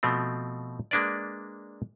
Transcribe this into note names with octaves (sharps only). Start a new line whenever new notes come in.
B2 F3 A3 C4
G#3 A#3 D4 B4 D5